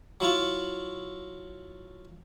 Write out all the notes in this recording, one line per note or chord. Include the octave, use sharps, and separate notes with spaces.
F#3 E4 F4 C#6